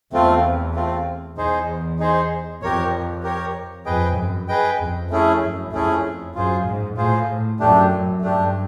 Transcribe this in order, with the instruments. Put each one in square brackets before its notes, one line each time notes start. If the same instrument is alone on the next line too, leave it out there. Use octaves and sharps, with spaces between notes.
[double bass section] E2 [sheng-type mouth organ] A3 C4 F4
[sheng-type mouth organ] A3 C4 F4
[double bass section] E2 [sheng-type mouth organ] D#4 G#4 C5
[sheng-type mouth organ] D#4 G#4 C5
[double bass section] F2 [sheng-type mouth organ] G4 A#4 C#5
[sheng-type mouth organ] G4 A#4 C#5
[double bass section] F2 [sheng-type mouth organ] G#4 B4 D#5 G5
[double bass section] F#2
[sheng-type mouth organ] G#4 B4 D#5 G5
[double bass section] F2
[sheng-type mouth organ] A3 C#4 E4 G#4
[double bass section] F#2
[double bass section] F2 [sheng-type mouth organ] A3 C#4 E4 G#4
[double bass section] F#2 [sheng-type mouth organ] F4 G#4 C5
[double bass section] G#2
[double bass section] A2 [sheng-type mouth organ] F4 G#4 C5
[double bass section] F#2 [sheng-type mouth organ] A3 D4 G4
[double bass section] G2 [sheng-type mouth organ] A3 D4 G4